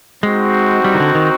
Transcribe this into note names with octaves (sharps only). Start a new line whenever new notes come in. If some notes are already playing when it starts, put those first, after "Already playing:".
G#3 C4 D#4 F#4
G3
D#3
D3
D#3